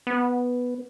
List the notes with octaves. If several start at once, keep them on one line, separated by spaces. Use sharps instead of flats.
B3